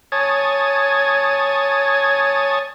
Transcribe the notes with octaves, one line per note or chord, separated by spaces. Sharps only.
C#5 G#5 A5 D#6